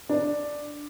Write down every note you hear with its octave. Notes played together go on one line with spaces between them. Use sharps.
D4